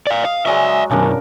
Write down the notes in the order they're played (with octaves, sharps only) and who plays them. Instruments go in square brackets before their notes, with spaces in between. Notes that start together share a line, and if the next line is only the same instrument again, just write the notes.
[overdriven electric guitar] D5 F5
[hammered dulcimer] D#5 [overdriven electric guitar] F5
[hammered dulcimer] F#3 G#3 G#5 [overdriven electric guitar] D5 E5
[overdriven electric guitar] B1 F#2 [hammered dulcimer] C#3 D4 A#4